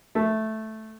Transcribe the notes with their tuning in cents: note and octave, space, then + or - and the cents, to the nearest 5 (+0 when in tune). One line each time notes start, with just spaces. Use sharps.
A3 -5